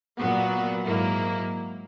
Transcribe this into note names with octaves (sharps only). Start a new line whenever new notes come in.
A#2 F#3 B3 F#4
G#2 F#3 A#3 E4